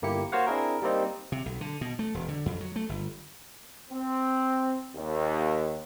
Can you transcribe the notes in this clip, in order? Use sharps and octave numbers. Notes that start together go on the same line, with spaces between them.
G1 A#3 E4 G4 C#7
A#3 F#4 C5 C#5 F5 F#5
C4 D4 E4 G#4 A#4
G3 A#3 C4 D#4
C3
B1
D3
B2
A3
E1
D3
F2
F#3
A3
G1
C4
D#2